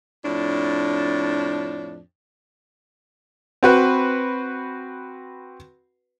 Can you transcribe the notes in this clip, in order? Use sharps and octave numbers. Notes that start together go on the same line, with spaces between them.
F2 A2 D4
C4 F#4 B4